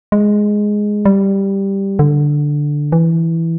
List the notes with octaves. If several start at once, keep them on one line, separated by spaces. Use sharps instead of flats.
G#3
G3
D3
E3